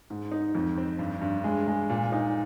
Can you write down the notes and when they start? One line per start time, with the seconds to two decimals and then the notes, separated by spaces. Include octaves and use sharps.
0.10 G#2
0.32 D#4
0.55 F2
0.78 C4
0.99 G2
1.21 G2
1.44 G#3
1.68 G#3
1.90 A#2
2.12 D#4